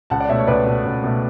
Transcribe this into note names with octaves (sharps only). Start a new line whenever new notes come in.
C#2 F#5 A5
D5 F#5
B2 A3 C#5 E5
C#5
C#2 B4 D5
B2 A3
C#2
B2 A3